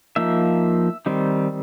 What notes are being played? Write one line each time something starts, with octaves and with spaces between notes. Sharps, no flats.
F3 A#3 D#4 E5
D#3 G3 C4 D#4